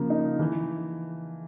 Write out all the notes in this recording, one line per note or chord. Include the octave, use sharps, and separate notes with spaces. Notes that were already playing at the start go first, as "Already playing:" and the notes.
Already playing: C#3 F3 A#3
D#4
E3